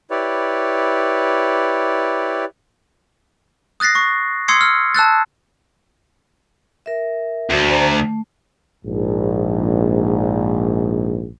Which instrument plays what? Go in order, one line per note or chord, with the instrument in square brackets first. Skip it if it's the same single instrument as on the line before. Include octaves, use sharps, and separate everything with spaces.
[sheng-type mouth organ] E4 G4 B4 C#5 D5
[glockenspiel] D#6 F#6 A6 A#6 C7
C#6
C6 D#6 E6 G#6 C7 C#7
E6 F6
A5 E6 F#6 A6
[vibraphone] A#4 E5
[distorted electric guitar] D2 [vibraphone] F#4
[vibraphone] C5 D5 A#5
A3
[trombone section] A#1 G#2